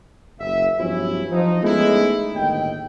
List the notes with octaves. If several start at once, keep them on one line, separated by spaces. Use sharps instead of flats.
F#1 E5
G2 F3 F#3 B3 C#4 E4
F3 D#4
G#3 A3 B3 C#4 D#4 E4
G1 D#2 A2 D#5 G5